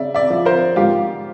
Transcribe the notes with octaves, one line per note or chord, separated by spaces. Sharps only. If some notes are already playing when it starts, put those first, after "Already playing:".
Already playing: C#3 D5 E5
D5 E5
F3
A#4 C5
G#2 F4 G4